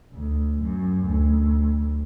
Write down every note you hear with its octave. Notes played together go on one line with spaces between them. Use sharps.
D2
F#2
D2